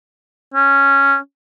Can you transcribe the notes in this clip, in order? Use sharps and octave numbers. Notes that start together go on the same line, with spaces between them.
C#4